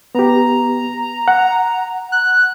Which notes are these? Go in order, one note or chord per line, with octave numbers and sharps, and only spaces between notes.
B3 G4 A#5
F#5
F#6